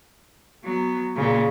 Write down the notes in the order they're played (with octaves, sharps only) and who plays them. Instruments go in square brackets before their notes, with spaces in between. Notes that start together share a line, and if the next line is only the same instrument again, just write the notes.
[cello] F#3 B3
A#2 C#3